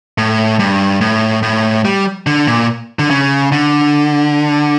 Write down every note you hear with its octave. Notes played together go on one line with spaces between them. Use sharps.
A2
G2
A2
A2
G3
D3
A#2
D3
C#3
D3